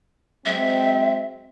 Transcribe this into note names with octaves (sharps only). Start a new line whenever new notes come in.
F#3 G#3 C4 E5